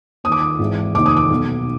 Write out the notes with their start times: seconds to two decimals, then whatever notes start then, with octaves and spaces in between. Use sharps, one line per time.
0.24 D#2 D#6
0.28 D#3 D6
0.40 D#6
0.59 G#1 G#2 E3
0.95 F1 D#2 D#3 D6
1.06 D#6
1.17 D6
1.30 B1 B2